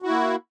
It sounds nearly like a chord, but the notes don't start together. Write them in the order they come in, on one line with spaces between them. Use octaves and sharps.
F#4 E4 A#3